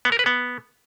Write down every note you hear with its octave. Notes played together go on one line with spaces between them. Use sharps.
B3
A#4
B4
B3